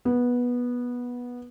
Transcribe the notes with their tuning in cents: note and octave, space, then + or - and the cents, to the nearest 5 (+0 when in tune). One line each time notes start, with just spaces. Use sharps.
B3 -15